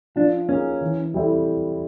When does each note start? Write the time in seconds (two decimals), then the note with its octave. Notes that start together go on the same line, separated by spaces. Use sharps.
0.16 F3 D4
0.49 A#3 C#4 D#4 G#4
0.81 E3
1.14 G3 C4 E4 A4